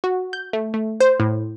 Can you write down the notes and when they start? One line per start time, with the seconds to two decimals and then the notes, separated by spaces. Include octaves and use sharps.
0.04 F#4
0.33 G6
0.53 A3
0.74 A3
1.01 C5
1.20 A2